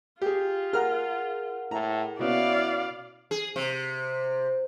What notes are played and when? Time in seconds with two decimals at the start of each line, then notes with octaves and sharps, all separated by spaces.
0.21 F4 G4 G#4
0.73 G#4 A#4 F#5 A#5 F6
1.71 A2 A#5
2.19 B2 B3 C#4 E4 D5 F5
3.31 G#4
3.56 C3